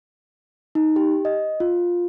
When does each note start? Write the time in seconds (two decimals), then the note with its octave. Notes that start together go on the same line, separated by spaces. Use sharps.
0.75 D#4
0.96 G4
1.25 D#5
1.60 F4